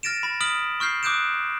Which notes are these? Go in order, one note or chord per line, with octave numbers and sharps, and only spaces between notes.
F6 A6 A#6 D7 E7
B5 A6
D#6 F6 B6 D7 F#7
C#6 F6 G6 C7
D6 D#6 F#6 G6 D7 E7